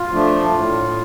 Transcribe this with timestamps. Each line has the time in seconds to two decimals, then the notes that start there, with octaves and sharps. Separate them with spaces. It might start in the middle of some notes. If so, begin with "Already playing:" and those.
Already playing: F4
0.12 F3 A3 D4
0.54 A2